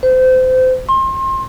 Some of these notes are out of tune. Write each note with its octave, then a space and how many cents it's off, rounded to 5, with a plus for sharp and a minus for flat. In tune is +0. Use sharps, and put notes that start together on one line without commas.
C5 -30
C6 +30